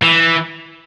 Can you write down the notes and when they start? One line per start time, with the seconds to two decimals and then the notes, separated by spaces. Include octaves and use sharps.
0.03 E3